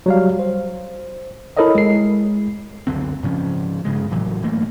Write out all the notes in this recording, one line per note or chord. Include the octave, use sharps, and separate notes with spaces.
F#3 G3 F5
C5
E4 A4 A#4 C#5 D#5 E5
G#3 C7
C#2 F#2 D3 C4
G#2 C#3 F3 C#4
G2 C#3 G#3
G#1 A2 E3 F#3
F#1 E3 A3 A#3